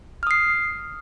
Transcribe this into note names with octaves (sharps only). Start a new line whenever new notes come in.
D#6 F6 C7